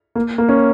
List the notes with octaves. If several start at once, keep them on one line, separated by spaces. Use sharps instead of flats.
A#3
A#3
C#4